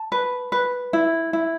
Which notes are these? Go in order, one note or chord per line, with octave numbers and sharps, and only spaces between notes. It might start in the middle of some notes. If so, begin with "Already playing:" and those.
Already playing: A5
B4
B4
E4
E4